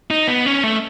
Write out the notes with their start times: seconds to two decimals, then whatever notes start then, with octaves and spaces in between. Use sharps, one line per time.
0.11 D#4
0.28 B3
0.46 C#4
0.63 A3